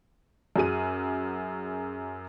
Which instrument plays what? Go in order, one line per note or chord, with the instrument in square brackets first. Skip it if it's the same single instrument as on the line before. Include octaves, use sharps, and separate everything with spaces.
[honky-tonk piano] F#2 F#4 G#4 D#7